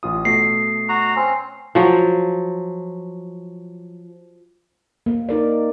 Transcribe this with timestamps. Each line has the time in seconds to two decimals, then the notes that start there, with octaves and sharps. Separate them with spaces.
0.03 A1 F4 D#6
0.25 B2 A3 A#6 C7
0.89 F#4 A#5
1.16 C4 C#4
1.75 F3 F#3
5.06 A#3
5.29 D#4 A#4 D5